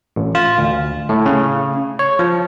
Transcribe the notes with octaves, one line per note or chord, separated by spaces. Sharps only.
A1
F4
D2
A2
C#3
C#5
F3